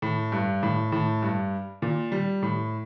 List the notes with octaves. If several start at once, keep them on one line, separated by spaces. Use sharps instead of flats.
A2
G2
A2
A2
G2
A#2
G3
A2